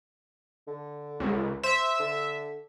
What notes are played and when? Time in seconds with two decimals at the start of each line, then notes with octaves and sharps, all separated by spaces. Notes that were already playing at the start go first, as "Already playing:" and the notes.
0.67 D3
1.20 C#2
1.63 C5 E5
2.00 D3